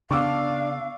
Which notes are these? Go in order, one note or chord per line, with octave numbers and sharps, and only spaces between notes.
C#3 B3 D4 F5 C#6 D6 E6